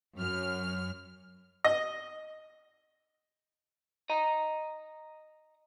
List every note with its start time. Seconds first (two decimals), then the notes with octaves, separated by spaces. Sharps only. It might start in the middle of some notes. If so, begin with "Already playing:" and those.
0.16 F#2 F6
1.64 D#5
4.10 D#5 A#5